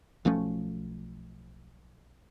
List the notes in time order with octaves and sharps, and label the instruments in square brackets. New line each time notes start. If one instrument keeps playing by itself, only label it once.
[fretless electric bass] B1 F3 A3 C#4